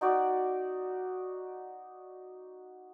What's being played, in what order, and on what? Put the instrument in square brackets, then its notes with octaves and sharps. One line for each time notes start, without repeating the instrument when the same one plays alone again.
[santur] D#4 F#4 D5